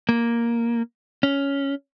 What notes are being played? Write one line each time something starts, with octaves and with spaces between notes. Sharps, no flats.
A#3
C#4